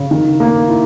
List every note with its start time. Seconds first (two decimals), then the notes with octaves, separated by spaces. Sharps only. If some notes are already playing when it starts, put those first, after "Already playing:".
Already playing: C#3
0.11 D#3
0.40 A#3
0.69 E4